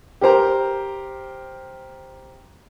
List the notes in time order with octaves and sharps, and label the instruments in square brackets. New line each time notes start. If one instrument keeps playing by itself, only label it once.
[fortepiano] G4 A#4 C5 A#5